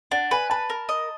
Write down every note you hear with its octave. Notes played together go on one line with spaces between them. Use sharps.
D4 F#5
B4 G#5
B4 A5
A#4
D#5